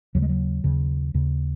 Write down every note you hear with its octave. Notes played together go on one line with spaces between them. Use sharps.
D#2 C#3 F#3
G#3
F#3
D#2 C#3
D#2 C#3